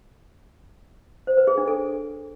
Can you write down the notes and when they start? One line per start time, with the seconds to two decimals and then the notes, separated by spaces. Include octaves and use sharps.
1.27 C5
1.37 B4
1.47 G#4
1.57 D4
1.68 A4